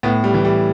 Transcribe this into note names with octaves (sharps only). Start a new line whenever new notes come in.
A2 B3
G3
E3
G3